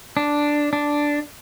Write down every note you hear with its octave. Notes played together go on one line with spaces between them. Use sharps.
D4
D4